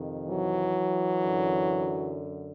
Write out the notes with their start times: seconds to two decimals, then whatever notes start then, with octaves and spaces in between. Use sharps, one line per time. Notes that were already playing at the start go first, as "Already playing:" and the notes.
Already playing: F2 C3 D#3
0.27 E3 F#3
1.21 F#2 D3